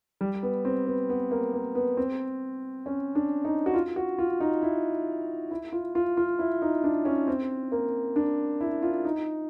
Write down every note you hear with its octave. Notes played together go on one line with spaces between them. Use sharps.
G3
B3
C4
B3
B3
A#3
A#3
B3
C4
C#4
D4
D#4
F#4
F4
F#4
F4
D#4
E4
E4
F4
F4
F4
E4
D#4
D4
C#4
C4
A#3
D4
E4
F4
D#4